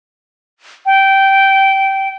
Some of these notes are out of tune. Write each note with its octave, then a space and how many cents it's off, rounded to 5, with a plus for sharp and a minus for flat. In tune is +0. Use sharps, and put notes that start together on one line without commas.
G5 -15